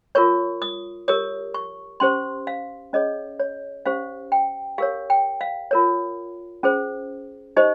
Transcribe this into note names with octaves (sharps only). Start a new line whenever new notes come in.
F4 A#4 C#5 C#6
D#6
G4 A#4 C#5 D#6
C#6
C#4 G4 C5 C6
F5
C#4 G#4 C#5 D#5
C#5
C#4 G4 C5 F5
G5
G4 A#4 C#5 F5
G5
F5
F4 A#4 C#5
C#4 G#4 C5
D#4 G4 C5 D#5